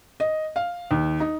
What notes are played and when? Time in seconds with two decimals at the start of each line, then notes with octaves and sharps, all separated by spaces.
0.20 D#5
0.56 F5
0.91 D#2
1.20 D#4